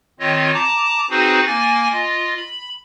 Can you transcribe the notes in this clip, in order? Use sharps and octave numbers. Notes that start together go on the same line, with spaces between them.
D#3 C4 F4 C#5 D#5
A5 A#5 D6
C4 D#4 F#4 G#4 B4 C5
A#3 G#5 A6
F4 D#5
B5